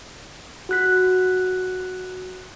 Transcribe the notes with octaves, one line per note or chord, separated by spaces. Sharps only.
F#4 F#6 B6